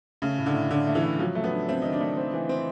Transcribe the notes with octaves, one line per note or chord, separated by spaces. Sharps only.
C#3 A3
A2
D3
A2
A2 D3
A3
E3
A2
F3 F#3
A3
B3
D4
A3 C4
D#3 D#4
D4
A3
C4
E3
C4